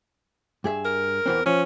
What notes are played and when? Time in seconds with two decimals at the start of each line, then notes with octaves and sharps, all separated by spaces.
0.64 G2 G#4 E5
0.85 A#4
1.26 E2 E3 C4
1.46 F3 C#4